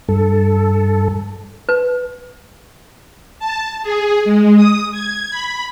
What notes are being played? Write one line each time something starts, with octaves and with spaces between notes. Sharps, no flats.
G2 A4
B4
A5
G#4
G#3
D#6
G#6
B5